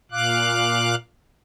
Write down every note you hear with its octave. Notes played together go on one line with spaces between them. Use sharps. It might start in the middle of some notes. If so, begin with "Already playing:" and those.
A#2 F5 D6 F#6